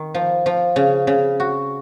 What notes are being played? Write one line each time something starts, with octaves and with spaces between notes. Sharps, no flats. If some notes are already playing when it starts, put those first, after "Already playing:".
Already playing: D#3
F3
F3
C#3
C#3
F#4